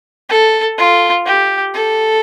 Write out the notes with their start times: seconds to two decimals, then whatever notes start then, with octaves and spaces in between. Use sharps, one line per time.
0.30 A4
0.78 F4
1.26 G4
1.74 A4